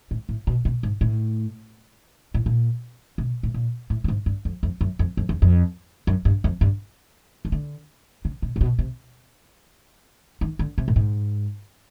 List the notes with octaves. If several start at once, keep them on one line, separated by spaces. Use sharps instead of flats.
A2
A2
B2
B2
G#2
A2
A2
A#2
B2
A2
A#2
A2
A2
G#2
G2
F2
F2
F#2
F2
F2
E2
F2
F#2
G2
F2
G2
D#3
D3
C#3
B2
A#2
B2
C3
D#3
D3
C3
A2
G#2